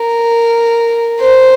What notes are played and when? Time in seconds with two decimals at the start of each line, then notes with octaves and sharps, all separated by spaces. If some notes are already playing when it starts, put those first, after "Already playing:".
Already playing: A#4
1.21 C5